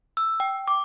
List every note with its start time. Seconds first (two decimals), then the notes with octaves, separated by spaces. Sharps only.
0.17 E6
0.40 G5
0.68 D6